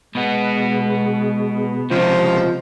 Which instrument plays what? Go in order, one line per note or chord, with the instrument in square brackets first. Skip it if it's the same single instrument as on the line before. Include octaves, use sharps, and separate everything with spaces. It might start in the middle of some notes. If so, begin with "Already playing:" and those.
[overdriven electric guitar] B2 B3 [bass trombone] G#3
[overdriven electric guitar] C#2 C3 [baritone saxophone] F3